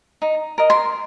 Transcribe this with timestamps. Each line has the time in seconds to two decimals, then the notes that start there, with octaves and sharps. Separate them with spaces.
0.22 D#4
0.58 A#4 D#5
0.70 C6